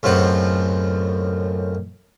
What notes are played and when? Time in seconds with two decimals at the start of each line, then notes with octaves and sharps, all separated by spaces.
0.03 C#2 F#2 A2 C4 F#5